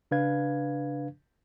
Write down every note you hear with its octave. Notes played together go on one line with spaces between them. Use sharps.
C#3 D4 B4 F5 G#6